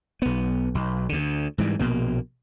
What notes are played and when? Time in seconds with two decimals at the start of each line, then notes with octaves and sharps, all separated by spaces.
0.22 B1 B3
0.75 B1
1.09 D2 D3
1.58 G#2 E3 G3
1.79 A#1 B2 A#3